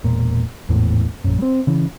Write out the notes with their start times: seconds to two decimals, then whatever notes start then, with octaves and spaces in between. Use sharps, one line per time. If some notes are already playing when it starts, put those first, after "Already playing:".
0.04 E1 A#2
0.69 G#1 E2 A2
1.24 A#1 F#2
1.39 G3 C4
1.67 C#3 E3